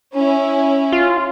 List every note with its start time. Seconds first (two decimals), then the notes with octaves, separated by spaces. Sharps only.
0.13 C#4 E4
0.92 F4